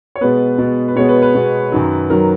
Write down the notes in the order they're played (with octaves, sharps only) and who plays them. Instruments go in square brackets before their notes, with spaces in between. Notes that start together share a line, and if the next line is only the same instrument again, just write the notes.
[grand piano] C#5
B2 G#3 B3 B4
B2 G#3 B3
B4
B2 G#3 B3 C#5
B4
B4
B2 G#3 B3
F#2 D#3 F#3
D#3 F#3 A#4